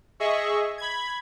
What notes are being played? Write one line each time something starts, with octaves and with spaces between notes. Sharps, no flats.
G#4 D#5 E5 C#6
B5 G#6